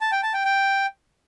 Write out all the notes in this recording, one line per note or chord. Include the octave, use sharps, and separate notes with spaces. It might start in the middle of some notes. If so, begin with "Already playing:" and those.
A5
G5
A5
G5
G5